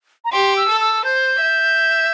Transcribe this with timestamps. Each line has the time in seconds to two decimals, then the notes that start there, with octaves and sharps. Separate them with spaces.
0.25 A#5
0.32 G4 C6
0.57 E6
0.68 A4
0.81 E6
1.05 C5 G6
1.41 E5